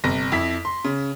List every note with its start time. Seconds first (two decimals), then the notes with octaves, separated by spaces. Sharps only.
0.04 G1 C3 A#6
0.32 F2 E4 B6
0.65 C6
0.85 C#3